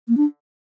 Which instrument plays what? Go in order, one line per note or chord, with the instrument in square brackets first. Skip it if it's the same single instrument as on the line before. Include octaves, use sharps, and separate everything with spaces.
[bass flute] A#3
D4